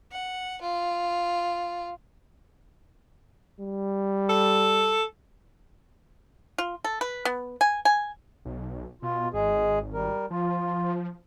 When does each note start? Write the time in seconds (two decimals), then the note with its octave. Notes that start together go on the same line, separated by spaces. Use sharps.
0.12 F#5
0.62 F4
3.60 G3
4.29 A4
6.58 F4
6.84 A4
7.01 B4
7.25 B3
7.61 G#5
7.85 G#5
8.45 B1
9.02 B2 F4
9.34 G#1 G#3 G#4
9.93 G3 A#4
10.30 F3 F4